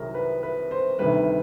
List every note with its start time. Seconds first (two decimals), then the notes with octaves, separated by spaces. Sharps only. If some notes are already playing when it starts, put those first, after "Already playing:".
Already playing: C2 C3 D#3 F#3 F#4 G#4 A#4
0.14 B4
0.43 B4
0.71 C5
0.99 D2 C3 D#3 G3 B4